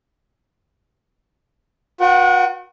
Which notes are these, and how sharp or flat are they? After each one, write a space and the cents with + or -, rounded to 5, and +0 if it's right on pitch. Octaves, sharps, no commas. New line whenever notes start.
F#4 -40 B4 -35 F#5 +35